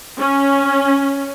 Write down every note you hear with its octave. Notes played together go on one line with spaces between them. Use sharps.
C#4